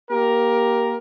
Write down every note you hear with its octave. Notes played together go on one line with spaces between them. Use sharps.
A#3 G4 A#4